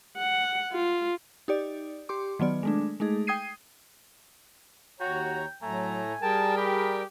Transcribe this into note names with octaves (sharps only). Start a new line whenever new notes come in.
F#5
F4
D#4 G4 D5
G4 C6 D6
D#3 F#3 B3 D5
G#3 A3 D4
G#3 A3 D#4 G#4
G5 D#6 G#6 C7 D#7
D#2 F#4 C#5 G5 A#5
A2 F#3 A3 G#5 A#5
G3 G#4 A#4 G5 A5
G4 B5